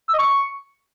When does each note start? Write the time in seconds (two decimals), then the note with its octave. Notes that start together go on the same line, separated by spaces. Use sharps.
0.08 E6
0.14 D#5
0.19 C#6